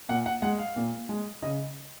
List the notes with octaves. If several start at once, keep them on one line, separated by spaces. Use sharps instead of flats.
A#2 F#5
F#5
G#3 F#5
F5
A#2
G#3
C#3 D#5